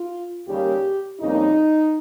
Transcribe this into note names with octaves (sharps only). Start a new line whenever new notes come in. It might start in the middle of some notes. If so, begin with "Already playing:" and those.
Already playing: F4
D#2 C#3 G3 A#3 G4
F2 C#3 G3 A#3 D#4